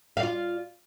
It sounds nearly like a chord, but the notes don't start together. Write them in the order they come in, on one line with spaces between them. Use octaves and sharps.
F5 D5 F4